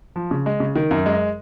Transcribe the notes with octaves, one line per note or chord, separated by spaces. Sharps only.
F3
C#3
G#3
C#3
D#3
F#2
G#3